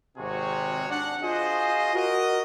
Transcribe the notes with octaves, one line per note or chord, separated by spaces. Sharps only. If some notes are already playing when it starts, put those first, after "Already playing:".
G#1 C3 C4 F#4 G#4 C#5
D4 F#5
F4 F#4 G#4 C5 D#5
F#4 A#4 D#5